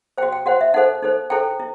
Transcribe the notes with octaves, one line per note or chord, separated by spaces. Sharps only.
C5 G5
F#4
G5
F#4 C5 F#5
E5
D#4 A4 C5 F#5
D#4 A4 C5
E4 A4 C5 G5
E4